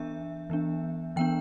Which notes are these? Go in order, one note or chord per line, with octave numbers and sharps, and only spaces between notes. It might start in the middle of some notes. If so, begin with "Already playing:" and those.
Already playing: E3 B3 D4 E5
E3 B3 D4
E3 B3 D4 G5